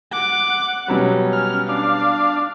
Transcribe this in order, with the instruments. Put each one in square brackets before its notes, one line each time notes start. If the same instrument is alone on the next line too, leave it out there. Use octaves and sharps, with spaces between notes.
[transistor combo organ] F#5 [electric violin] D6
[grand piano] B2 F#3 G3 [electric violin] C#4
[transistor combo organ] F6
[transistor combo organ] D4 [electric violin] F5